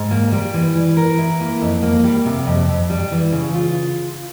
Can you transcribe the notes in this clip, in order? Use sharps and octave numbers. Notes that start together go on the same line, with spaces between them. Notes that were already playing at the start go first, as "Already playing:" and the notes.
Already playing: G#2
A#3
G3
E3
E3
A#4
E4
A#3
F2
A#3
G3
C3
F2
F2
G3
E3
C#3
F4